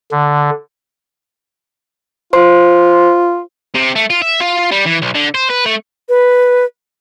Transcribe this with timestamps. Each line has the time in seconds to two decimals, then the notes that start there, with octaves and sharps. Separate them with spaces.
0.11 D3
2.33 F4 C5 C6
3.75 C3
3.96 A3
4.10 F4
4.22 E5
4.41 F4
4.72 G3
4.86 E3
5.02 B1
5.15 D3
5.35 C5
5.50 B4
5.66 A3
6.09 B4